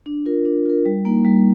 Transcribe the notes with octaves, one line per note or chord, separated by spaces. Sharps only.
D4
F4 A#4
D4
F4 A#4
G3
A#3 D#4
G3